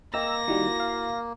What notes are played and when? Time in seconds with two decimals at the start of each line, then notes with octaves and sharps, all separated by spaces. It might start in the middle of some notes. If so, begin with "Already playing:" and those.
0.14 A#3 D#5 G5 A#5 E6 A#6
0.48 D#3 G3 E4 F#4
0.80 F5